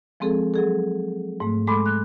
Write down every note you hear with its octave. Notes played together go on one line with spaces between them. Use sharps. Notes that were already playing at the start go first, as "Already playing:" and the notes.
F3 G#3 C4 G#4 A4
F#3 G#4 A4
G#2 A3
G#3 A4 B5 C6 D6
F#6